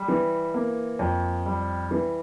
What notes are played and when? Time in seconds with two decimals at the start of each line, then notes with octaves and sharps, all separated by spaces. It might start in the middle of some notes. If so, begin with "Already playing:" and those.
Already playing: G3
0.08 E3
0.54 A#3
0.99 F2
1.46 G3
1.91 E3